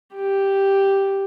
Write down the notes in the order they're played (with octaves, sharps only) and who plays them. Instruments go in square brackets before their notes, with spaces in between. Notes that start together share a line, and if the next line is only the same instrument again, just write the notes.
[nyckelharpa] G4